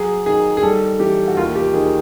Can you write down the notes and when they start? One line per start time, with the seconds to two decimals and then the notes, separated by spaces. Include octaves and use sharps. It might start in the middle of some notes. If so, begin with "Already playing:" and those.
Already playing: F#3 G#4
0.26 D#3 G#4
0.57 G#4
0.63 G3 A4
1.00 E3 G4
1.28 F#4
1.37 D#2 F4
1.56 G4
1.74 D#3 G#4